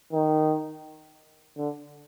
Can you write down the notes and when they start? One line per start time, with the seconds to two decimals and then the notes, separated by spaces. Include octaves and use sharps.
0.13 D#3
1.57 D3